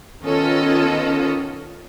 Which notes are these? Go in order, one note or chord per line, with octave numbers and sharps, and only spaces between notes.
D#3 B3 C#4 F4 A4 D#5